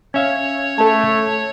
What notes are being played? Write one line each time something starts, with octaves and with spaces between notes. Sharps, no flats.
C#4 C#5 E5 F5
A3 A4 A5